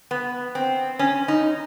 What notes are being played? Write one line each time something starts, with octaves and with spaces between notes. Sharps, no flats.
B3
C4
C#4
D#4